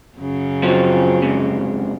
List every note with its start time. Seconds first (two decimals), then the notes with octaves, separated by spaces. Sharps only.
0.18 F#2 C#3
0.63 F3 F#3 C4
1.22 F2 G#2 C3